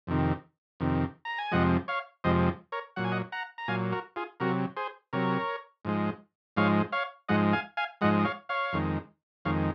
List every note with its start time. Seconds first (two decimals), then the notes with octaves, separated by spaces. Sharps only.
0.07 F2 C3 D#3
0.80 F2 C3 D#3
1.25 A#5
1.39 G#5
1.52 F2 C3 F3 G#3 D#5 F#5
1.88 C#5 F5
2.24 F2 C3 F3 G#3 C5 D#5
2.72 A#4 C#5
2.96 A#2 F#3 F#5
3.04 G#5
3.12 D#5 F#5
3.32 F#5 A#5
3.58 A#5
3.68 A#2 F#3 F5 G#5
3.92 F#4 A#4
4.16 F4 G#4
4.40 C3 F#3 F#4 A#4
4.77 G#4 C5
5.13 C3 F#3 A#4 C#5
5.85 G#2 F3 G#3
6.57 G#2 F3 G#3 C#5 F5
6.92 C#5 F5
7.29 G#2 F3 G#3 D#5 F#5
7.53 F5 G#5
7.77 F5 G#5
8.01 G#2 F3 G#3 D#5 F#5
8.19 D#5
8.25 C#5 F5
8.49 C#5 F5
8.73 F2 D#3 G#3
9.45 F2 D#3 G#3 C#5 F5